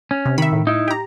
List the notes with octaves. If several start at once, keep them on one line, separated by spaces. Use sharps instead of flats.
C#4
C3
D#3 E5 B5
A2
D#4 E4
G4 A#5